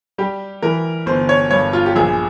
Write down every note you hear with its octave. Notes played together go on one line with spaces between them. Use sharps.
G3 G4
E3 A#4
G1 C5
C#5
G2 C#5
F4
G4
A#1 G#4